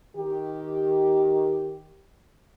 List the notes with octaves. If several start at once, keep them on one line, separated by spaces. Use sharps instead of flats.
D#3 G4